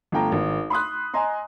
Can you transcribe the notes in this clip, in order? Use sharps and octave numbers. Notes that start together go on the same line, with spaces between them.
G1 A3 G5 A#5
G#1
B5 C6 D#6 F#6
D#5 G#5 A#5 C6